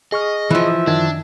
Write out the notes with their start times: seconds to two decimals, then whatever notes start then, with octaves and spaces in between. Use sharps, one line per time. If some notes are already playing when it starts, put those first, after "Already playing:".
0.12 G#4 D#5 C#6 F6
0.51 E3 F3 E5
0.87 F#2 D#3 D4 G#6